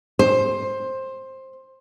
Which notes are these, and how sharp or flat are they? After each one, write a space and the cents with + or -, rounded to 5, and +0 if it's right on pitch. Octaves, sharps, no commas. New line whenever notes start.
C5 +15